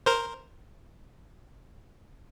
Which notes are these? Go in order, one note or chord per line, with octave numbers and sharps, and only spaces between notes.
A#4 C5